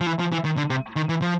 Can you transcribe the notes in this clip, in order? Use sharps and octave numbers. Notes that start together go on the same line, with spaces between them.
F3
E3
F3
E3
D#3
D3
C3
D#3
E3
F3